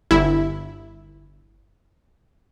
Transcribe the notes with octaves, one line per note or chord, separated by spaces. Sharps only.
G1 E4